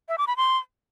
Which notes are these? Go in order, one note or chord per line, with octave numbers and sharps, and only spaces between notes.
E5
D6
B5
C6